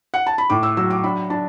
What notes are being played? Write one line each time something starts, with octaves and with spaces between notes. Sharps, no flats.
F#5
A5
B5
A2 D6
E6
F#3 E6
D6
D4 B5
D4 A5